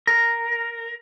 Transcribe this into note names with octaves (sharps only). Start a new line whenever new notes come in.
A#4